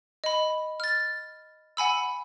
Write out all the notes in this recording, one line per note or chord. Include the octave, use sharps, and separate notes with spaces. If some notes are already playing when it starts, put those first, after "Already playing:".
D#5 B5
F6 A6
F#5 G#5 B5 E6